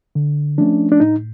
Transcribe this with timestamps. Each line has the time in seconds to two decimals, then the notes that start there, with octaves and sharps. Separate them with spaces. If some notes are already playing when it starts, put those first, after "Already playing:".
0.15 D3
0.58 F3 A3 C#4 D4
0.92 D4
1.00 A2 D#4